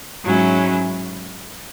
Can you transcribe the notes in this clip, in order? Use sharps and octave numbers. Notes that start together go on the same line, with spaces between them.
G#2 F#3 C#4 E4